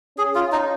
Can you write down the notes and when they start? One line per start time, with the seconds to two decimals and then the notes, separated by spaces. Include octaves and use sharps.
0.18 C#4 G#4
0.35 F4
0.52 D#4